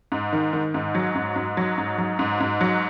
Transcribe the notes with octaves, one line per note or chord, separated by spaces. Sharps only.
G#2
D#3
D#3
G#2
F#3
G#2
G#2
F#3
G#2
F#3
G#2
G#2
F#3